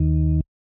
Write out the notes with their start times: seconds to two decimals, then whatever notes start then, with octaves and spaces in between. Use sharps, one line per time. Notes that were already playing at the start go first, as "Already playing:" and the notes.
Already playing: D#2 D#3